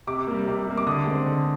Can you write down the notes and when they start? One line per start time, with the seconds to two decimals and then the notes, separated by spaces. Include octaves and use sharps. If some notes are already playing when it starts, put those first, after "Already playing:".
0.07 C3 D6
0.27 G3 A#3
0.47 C3
0.67 G3 A#3
0.77 D6
0.87 D3 D#6
1.06 G#3 C4
1.26 D3